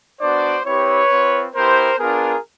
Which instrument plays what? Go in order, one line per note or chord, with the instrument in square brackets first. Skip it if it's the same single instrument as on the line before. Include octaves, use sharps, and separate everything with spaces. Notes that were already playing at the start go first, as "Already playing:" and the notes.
[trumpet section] B3 D4 F#4 C5 D5
C4 E4 G4 B4 C#5
C4 F4
B3 E4 G4 A#4 C5
B3 D4 F4 G#4 A#4